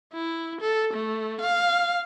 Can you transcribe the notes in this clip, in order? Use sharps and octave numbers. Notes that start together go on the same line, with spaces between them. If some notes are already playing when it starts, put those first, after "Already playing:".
E4
A4
A3
F5